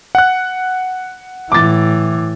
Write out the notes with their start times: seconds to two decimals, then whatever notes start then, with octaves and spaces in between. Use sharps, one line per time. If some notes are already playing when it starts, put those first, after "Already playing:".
0.15 F#5 F#6
1.52 A2 E3 D6 A6